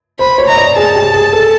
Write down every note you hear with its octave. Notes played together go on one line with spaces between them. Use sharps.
C5 B5
C#5
D#5 A#5
D5
G#4 A5
G4
G#4
A4